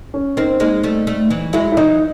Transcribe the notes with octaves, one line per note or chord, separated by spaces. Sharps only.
C#4
A#3 C4 D#4
G#3 A#3 D#4
G3 A3
G3 A3
E3 F#3
F#3 G#3 E4
E4
E3 F#3 D#4